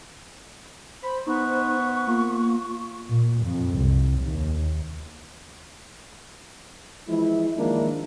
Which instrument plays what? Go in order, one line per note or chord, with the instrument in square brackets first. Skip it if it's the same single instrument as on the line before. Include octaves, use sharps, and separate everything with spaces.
[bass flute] C5 [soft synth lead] B5
[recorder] B3 [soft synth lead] D#4 [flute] C#6
[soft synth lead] A#3 [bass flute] F4
[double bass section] A#2
F2
C2
D#2
[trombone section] E3 F3 G#3 E4
D#3 F3 G#3 A#3 D4 E4